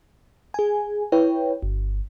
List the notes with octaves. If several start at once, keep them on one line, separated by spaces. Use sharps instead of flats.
G#4 G#5
E4 B4 C#5 G5
G1